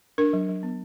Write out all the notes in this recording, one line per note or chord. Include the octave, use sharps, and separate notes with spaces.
D4 A#4
F#3
F#3
B3